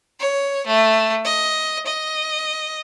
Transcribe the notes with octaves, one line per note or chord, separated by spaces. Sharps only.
C#5
A3
D#5
D#5